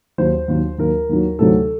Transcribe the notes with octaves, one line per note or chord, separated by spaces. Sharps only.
D#2 D#3 F#3 C5
D#2 D#3 F#3
D#2 D#3 F#3 A#4
D#2 D#3 F#3
D2 C3 D#3 F#3 A4